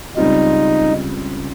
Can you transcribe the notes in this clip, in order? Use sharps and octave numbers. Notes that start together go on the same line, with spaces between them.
C#2 C#3 G3 C4 D#4 F4